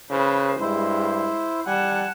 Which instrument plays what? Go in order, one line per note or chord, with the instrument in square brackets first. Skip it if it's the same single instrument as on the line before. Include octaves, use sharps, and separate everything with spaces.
[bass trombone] C#3 [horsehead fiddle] B4 C5
[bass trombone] G2 [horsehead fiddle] G#3 [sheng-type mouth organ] E4 C5
[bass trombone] G3 [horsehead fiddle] F#5 A5 [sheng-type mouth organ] G#5